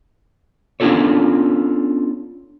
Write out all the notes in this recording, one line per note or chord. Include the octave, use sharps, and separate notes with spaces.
B3 C#4 D4 F4 A4 C#5